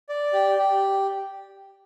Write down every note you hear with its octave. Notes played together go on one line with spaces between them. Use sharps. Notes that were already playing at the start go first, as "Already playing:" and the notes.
D5
G4
G4